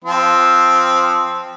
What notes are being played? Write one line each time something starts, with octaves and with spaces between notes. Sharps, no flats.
F3 C4